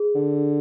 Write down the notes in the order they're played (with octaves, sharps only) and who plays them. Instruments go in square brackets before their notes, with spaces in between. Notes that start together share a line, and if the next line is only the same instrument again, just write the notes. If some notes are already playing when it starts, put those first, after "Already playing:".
Already playing: [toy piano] G#4
[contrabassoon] D3